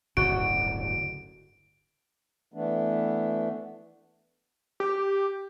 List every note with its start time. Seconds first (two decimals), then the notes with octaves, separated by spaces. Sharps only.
0.17 D1 G1 C#3 F#4 D7
2.54 E3 A3 B3 D4
4.80 G4